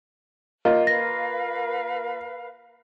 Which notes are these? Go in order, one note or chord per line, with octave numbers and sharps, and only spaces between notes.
A#3 F4 D#5
A#4 B4 F5 A#6